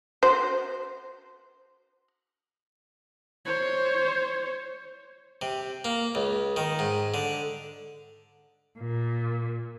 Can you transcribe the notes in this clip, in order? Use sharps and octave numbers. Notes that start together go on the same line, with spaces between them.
F#4 C5
C5 C#5
C3
A#3
C#2
D#3
G#2
D3
A#2